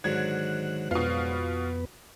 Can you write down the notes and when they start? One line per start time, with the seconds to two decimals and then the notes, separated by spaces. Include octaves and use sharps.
0.04 G#2 D3 D#3 F#3 F#6 G#6
0.91 F2 B2 B3 F4 B4